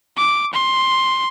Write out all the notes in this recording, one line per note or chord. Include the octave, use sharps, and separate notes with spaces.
D6
C6